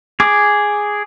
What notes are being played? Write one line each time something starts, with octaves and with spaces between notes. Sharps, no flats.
G#4 D6